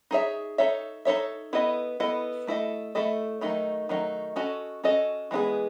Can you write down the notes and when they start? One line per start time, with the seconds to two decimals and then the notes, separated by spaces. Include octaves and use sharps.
0.11 D#4 G#4 C#5 E5
0.58 D#4 A4 C#5 E5
1.05 D#4 A4 C#5 E5
1.53 B3 E4 A4 D#5
2.00 B3 E4 A4 D#5
2.47 A3 E4 A4 D#5
2.95 A3 E4 A4 D#5
3.41 D#3 F#3 A3 D#4
3.89 D#3 F#3 A3 D#4
4.36 C#4 F#4 A4 D#5
4.84 C#4 F#4 A4 D#5
5.31 E3 G#3 B3 D#4 G#4